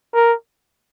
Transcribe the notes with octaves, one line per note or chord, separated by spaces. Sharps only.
A#4